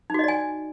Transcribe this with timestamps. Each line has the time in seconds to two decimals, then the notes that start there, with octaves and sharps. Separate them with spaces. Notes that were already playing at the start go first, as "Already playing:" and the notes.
0.10 D#4
0.14 F#4
0.19 D#5
0.24 D5
0.28 G#5